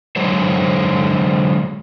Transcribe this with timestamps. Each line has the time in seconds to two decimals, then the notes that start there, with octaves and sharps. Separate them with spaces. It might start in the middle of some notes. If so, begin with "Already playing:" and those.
0.16 D3 F#3 G#3 C5 C#5